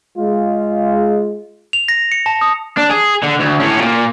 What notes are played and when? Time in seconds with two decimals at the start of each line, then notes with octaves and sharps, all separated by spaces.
0.17 G#3 F4
1.73 F7
1.88 A#6
2.12 C#7
2.26 A5
2.41 D#6
2.77 D4
2.90 G#4
3.23 D3
3.39 D2
3.59 A2 C#4
3.79 A#2